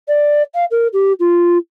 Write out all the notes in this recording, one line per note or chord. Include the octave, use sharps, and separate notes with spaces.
D5
F5
A#4
G4
F4